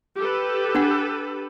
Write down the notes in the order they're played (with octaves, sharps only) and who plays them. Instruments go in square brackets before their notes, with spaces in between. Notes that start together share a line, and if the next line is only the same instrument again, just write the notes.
[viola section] G4 A4 B4
[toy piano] D4 F#5